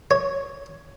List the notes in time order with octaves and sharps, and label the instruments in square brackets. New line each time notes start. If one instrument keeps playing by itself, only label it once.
[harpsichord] C#5